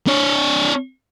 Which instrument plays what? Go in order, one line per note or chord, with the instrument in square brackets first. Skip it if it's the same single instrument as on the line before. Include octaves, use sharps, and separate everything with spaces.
[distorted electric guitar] D4 C#5